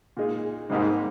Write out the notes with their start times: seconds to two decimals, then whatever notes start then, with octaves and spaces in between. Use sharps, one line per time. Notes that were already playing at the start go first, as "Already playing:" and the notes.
0.17 A#2 G#3 D#4 G#4
0.70 G#2 C3 G3 A#3 D#4 G4